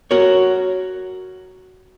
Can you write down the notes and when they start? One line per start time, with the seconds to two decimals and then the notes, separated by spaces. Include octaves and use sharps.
0.11 F#4 A#4 C#5